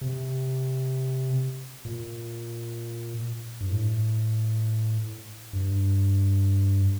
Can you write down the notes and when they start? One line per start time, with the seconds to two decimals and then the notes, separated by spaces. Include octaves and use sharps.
0.01 C3
1.85 A#2
3.60 G2
3.69 A2
5.53 G2